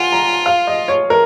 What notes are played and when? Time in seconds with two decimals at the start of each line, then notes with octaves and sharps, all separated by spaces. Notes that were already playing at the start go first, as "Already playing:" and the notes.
Already playing: F4 F#5 G#5
0.12 A#5
0.46 F5
0.67 D#5
0.88 C#5
1.10 A#4